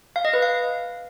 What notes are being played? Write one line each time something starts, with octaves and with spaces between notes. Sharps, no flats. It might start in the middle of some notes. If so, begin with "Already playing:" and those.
F5
D#5
B4
F5